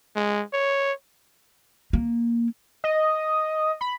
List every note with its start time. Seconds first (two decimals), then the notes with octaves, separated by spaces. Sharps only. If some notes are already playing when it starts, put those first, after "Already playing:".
0.16 G#3
0.53 C#5
1.93 A#3
2.84 D#5
3.81 B5